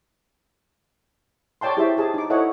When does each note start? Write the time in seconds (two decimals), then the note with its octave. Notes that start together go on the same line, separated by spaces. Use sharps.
1.61 C#5 D5 G5 A5 C6
1.77 E4 G4 G#4 C5 E5
1.97 G4 G#4 A5
2.14 D#4 D6
2.30 E4 A4 C5 C#5 D#5 F#5